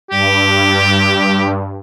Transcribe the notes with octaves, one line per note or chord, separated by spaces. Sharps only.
G2 G4